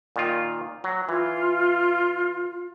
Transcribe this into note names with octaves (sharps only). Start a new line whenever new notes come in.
A#2 D#3 F4
F#3
E3 F4